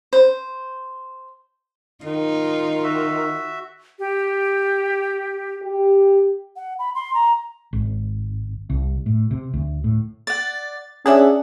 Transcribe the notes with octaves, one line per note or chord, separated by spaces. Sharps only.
C5
D#3 D#4 F4
F#4 E5
G4
G4
F#5
B5
C6
A#5
G#1
C2
A2
C3
D2
A2
D5 F#5 A6
C#4 D4 G#4 E5 F#5 A5